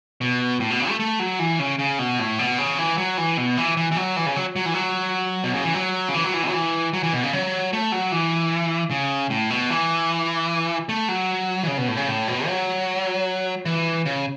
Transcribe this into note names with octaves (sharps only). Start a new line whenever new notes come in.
B2
A2
B2
C#3
A3
A3
F#3
E3
C#3
C#3
B2
A2
B2
C#3
E3
F#3
E3
B2
E3
E3
E3
F#3
E3
C#3
F#3
F#3
E3
F#3
B2
C#3
E3
F#3
C#3
E3
F#3
E3
B2
F#3
E3
F#3
E3
B2
C#3
F#3
A3
F#3
E3
C#3
A2
B2
E3
A3
F#3
E3
C#3
B2
A2
C#3
A2
B2
F#3
E3
C#3